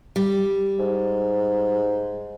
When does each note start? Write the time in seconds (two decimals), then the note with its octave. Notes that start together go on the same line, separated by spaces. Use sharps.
0.16 G3
0.79 G#2